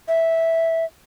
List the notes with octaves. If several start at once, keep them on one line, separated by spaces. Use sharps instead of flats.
E5